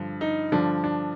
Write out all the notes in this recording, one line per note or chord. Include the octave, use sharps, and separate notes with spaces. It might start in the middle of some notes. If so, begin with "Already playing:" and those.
Already playing: G2 D3 F3
D#4
G2 D3 F3 D4
D4